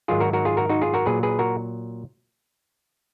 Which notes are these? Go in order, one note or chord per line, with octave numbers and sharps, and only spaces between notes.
G#2 D#3 F#3 F4 G#4
F#4 A#4
F#4 A#4
F4 G#4
F#4 A#4
D#4 F#4
F4 G#4
F#4 A#4
A#2 F#3 G#4 B4
G#4 B4
F#4 A#4